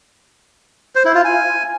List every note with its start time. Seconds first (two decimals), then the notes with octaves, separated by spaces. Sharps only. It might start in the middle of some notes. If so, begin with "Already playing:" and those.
0.95 C5
1.05 E4
1.15 F4
1.25 G#5